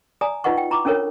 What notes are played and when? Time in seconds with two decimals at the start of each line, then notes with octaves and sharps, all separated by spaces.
0.21 D5 G#5 A#5 D#6
0.44 D#4 F4 B4 D#5 F#5 C#6
0.57 G5
0.71 E4 A#5 B5 C#6 D6
0.85 C#4 D4 A4 A#4 C#5